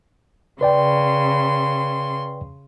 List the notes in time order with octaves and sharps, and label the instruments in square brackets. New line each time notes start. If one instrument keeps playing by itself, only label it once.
[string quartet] C#3 C6 [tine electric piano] B4 D5 G5